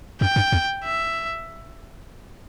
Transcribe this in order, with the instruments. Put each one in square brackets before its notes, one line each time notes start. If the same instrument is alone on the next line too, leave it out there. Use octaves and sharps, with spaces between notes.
[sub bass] F#2 [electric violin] G5
[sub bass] G2
E2
[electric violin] E5